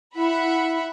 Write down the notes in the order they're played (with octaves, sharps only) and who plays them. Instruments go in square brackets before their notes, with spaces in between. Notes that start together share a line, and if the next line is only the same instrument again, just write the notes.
[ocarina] E4 [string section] E5 F#5 B5